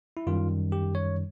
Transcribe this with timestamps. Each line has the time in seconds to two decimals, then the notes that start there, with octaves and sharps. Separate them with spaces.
0.17 E4
0.27 F#2 D#3 G3 F4
0.72 G4
0.95 C#5